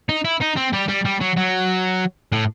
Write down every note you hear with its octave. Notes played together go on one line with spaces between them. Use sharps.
D#4
E4
D#4
C4
G3
G3
G3
F#3
F#3
A2